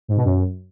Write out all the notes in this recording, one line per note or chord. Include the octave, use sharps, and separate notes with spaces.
G#2
B2
F#2